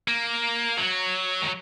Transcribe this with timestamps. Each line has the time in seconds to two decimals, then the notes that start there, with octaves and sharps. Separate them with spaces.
0.08 A#3
0.77 F#3
1.42 D#3